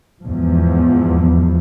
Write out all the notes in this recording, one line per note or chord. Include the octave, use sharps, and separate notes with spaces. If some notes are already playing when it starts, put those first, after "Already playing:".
E2 G#2 F3